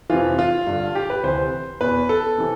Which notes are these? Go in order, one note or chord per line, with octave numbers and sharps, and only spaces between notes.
F2 C3 E3 F4
F4
G2 D3
G4
B4
D2 C3 E3 C5
E2 B2 B4
A4
C3 E3